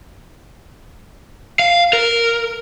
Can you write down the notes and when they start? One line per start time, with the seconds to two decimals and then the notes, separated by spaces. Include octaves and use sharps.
1.59 F5
1.93 A#4